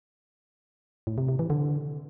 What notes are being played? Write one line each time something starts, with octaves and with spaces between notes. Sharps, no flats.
A2
C3
C3
E3
D3